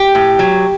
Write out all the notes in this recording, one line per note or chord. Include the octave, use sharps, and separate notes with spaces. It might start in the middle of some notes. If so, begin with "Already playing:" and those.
Already playing: G4
A2
F#3